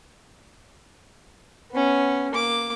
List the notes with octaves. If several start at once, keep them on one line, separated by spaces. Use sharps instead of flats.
B3 C#4
A#3 D6